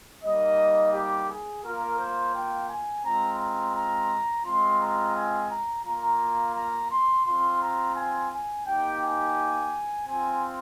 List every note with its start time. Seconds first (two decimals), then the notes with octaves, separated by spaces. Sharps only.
0.24 G3 A#3 D#4 D#5
0.93 G4
1.29 G#4
1.64 A#3 F4 A#4
1.99 C5
2.35 G5
2.69 G#5
3.04 G#3 C4 F4 A#5
3.40 A#5
3.75 A#5
4.45 G#3 C4 F4 C6
4.80 A#5
5.15 G#5
5.50 A#5
5.86 A#3 F4 A#5
6.56 A#5
6.91 C6
7.25 C4 F4 C6
7.61 A#5
7.96 G#5
8.31 G#5
8.66 A#3 D#4 G4 G5
9.02 G#5
10.07 C4 F4 G#5